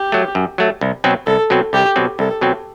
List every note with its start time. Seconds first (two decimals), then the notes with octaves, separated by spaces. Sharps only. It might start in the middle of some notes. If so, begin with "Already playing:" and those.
Already playing: G4
0.12 F#3 A3
0.35 F#2
0.58 F#3 A3
0.81 C2
1.04 B2 F#3 C4
1.26 C2 A4
1.50 B2 F#3 C4
1.73 C2 G4
1.96 B2 F#3 C4
2.19 C2 A4
2.41 B2 F#3 C4